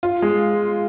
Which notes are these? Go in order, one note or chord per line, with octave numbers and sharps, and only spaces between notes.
F4
G#3